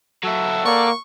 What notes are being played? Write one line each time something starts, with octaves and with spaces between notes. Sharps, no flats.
F#3 E4 A4 F#5
A#3 D5 C#6